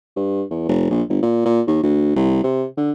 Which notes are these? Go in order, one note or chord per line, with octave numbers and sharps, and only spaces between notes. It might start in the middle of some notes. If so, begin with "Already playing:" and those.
G2
E2
F1
A#1
G1
A#2
A#2
D#2
D2
C2
C3
D3